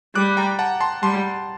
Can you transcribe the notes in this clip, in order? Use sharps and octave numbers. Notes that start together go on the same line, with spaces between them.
G3 D6 F#6
G5 A#5
F#5 A5
A5 C6
G3 A5 C6